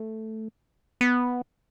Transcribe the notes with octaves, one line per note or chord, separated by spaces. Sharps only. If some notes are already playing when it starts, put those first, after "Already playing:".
Already playing: A3
B3